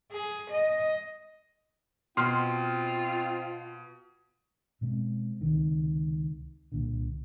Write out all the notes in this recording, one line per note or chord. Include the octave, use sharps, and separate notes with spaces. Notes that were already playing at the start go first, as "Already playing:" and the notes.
G#4
D#5
B2 C4 F4 C6 F6 C7
B2 G#3 C4
C#2 C3 D#3
C2 A#2 D3